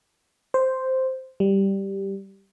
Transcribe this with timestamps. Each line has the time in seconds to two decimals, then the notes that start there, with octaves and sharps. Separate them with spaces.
0.54 C5
1.40 G3